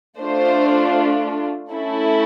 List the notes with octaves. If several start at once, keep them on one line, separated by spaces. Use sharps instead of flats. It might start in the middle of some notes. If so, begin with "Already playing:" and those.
A3 D4 F4 C5
A3 C#4 E4 A4